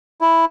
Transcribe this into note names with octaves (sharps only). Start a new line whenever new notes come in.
E4